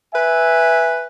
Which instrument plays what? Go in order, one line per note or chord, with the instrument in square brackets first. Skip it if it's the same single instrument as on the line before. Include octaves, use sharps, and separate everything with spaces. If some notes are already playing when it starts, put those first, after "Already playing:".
[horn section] B4 E5 G#5